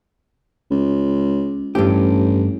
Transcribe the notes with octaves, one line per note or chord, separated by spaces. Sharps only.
C#2
A1 G2 G4